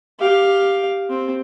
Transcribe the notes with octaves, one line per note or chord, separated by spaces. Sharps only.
G4 F5
C4